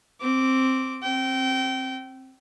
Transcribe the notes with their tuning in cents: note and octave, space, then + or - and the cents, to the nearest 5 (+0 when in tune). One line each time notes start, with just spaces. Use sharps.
C4 +5 D6 -10
C4 +20 G5 -25